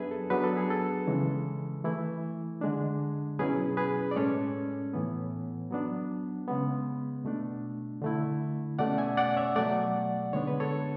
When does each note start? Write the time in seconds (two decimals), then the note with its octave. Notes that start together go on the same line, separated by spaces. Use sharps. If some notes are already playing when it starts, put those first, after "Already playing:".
Already playing: F#3 B3 D4 G#4 B4 E5 G#5
0.11 A4
0.30 F#3 B3 D4 B4
0.44 A4
0.57 G#4
0.70 A4
1.07 C#3 E3 G#3
1.84 E3 A3 E4
2.61 D3 G#3 D4
3.39 B2 F#3 C#4 E4 G#4 B4
3.77 G#4 B4
4.11 D5
4.16 A2 G#3 C#4 A4 C#5
4.93 A2 E3 B3
5.71 F#3 B3 D4
6.47 C#3 G#3 B3
7.25 B2 A3 D4
8.02 D3 A3 E4
8.79 B2 A3 C#4 D5 F#5
8.98 E5 G#5
9.17 D5 F#5
9.37 C#5 E5
9.56 B2 F#3 A3 D5 F#5
10.33 D3 G#3 B3 D4 C#5
10.47 B4
10.60 A4 C#5